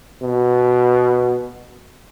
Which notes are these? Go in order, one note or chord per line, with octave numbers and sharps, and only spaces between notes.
B2